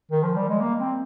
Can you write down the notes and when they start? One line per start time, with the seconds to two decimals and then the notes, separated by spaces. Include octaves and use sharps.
0.11 D#3
0.23 F3
0.36 G3
0.49 G#3
0.60 A#3
0.79 C4